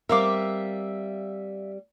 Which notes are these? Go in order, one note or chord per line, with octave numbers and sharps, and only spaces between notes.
G3 C4 A#4 E5 F5 D6